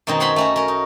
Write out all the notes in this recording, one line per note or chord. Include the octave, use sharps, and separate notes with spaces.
F#2 B2 D#3 F#3 C4 D#4
C5 C#5 F#5 G#5 B5 C6
A3 C#4 F#4
C#4 A#4
D#4